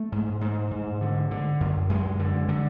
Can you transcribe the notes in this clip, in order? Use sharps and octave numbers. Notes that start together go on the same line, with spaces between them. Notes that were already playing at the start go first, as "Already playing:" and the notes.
Already playing: A3
G#2
G#2
G#2
D3
D3
F#2
F#2 G#3
D3
D3